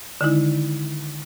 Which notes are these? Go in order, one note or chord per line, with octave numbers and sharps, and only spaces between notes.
D3 D#3 G#3 D#4 E4